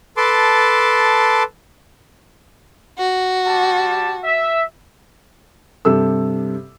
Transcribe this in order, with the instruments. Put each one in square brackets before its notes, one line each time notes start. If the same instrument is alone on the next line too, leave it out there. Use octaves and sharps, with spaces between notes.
[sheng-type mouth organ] A4 B4 A5 C6 D6
[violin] F#4
[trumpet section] G3 G4 A5
E5
[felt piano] G2 C3 G4 A4 E6